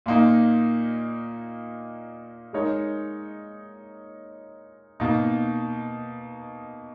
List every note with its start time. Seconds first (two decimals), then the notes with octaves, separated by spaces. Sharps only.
0.06 A#2 A#3 D#4
2.53 G#3 D#4 A#4 C#5
5.00 B2 A#3 D#4